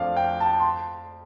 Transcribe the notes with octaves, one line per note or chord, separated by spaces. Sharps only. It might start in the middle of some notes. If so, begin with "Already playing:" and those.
Already playing: F2 F3 A3 D4 D5 F5
G5
A5
C6